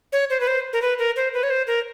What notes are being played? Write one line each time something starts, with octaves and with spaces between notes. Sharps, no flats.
C#5
C5
B4
C5
A#4
B4
A#4
C5
B4
C#5
C5
A#4